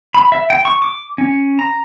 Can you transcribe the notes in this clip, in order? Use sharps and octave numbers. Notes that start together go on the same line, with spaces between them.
B5
E5
G5
C#6
D6
C#4
A#5